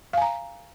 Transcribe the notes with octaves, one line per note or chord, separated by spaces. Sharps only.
F5 G#5 A#5